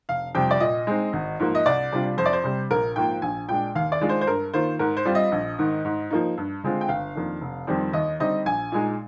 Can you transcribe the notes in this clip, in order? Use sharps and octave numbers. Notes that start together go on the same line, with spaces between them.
F1 F5
F2 C3 G3 G5
D5
A#2 D#5
G#3 C4 D#4
G#1
G#2 F3 A#3
D#5
C2 D5
C3 G3 D4 F4
F2 C5
D5
C5
C3 G3
A#1 A#4
G#2 F3 A#3 F4 G5
A#1 G#5
A#2 G#3 D4 G5
D#2 F5
D5
D#3 G#3 D4 F4
C5
C5
G2 A#4
D#3 A#3 F4 C5
G#2 A#4
C5
G3 C4 F4
D#5
A#1
G#2 D#3
G#2
F3 A#3 D#4
G2
D3 G#3 C4 F4
G5
G1 F5
F2 D#3 A#3 D4
F1
F2 D#3 G3 C4
D#2 D#5
D3 G3 C4 D#4 D#5
A#1 G#5
A#2 G#3 D#4